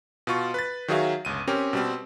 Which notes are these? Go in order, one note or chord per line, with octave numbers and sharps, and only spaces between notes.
B2 F4 C#6
B4 A6
D#3 F#3 F#4 G#4 E5 F5
G1 C#2 D#7
C4 C#4 G4 A#4
B2 G3 C4